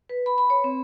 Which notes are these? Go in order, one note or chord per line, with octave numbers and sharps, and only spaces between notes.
B4
B5
B5
C#5
C4